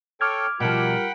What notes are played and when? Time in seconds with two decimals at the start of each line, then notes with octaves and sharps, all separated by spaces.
0.21 A4 C#5 G5 D6 F6 G#6
0.60 B2 F3 G3 F4 A#4 F#5 G5 B5